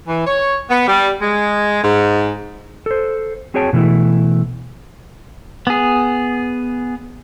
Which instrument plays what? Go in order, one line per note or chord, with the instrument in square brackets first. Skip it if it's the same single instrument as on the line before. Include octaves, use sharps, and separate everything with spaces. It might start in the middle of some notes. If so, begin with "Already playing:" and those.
[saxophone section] E3
C#5
B3
G3
G#3
G#2
[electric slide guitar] A4 C5
C4 F#4 G#4 C#5 G5 A5
B2 E3 A3 E4
[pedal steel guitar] B3 G#4